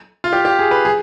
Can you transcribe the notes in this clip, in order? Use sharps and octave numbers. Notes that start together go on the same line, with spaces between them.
F4
G4
G4
G#4
B4
G#4